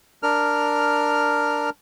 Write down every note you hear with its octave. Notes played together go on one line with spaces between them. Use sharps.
D4 A#4 F6